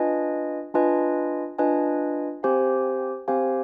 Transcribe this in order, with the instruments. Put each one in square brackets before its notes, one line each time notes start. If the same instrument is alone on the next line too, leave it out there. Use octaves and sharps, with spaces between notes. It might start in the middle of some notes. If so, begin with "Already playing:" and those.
Already playing: [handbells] D4 F4 B4 D#5 G#5
D4 F4 B4 D#5 G#5
D4 F4 B4 D#5 G#5
C4 G4 C5 F5 G#5
C4 G4 C5 F5 G#5